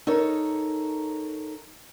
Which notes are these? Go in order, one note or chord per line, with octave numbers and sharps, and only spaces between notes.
D#4 A4 A#4 C#5